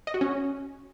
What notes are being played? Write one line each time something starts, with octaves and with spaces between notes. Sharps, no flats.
D#5
F#4
C#4